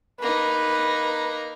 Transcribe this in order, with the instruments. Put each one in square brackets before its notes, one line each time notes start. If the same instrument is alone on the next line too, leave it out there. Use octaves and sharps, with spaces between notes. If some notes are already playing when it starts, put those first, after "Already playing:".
[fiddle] A#3 D#4 [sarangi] B4